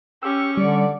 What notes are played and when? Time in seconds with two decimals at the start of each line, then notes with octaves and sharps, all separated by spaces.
0.23 C#4 G4 C#6 E6
0.57 D3 G3 D5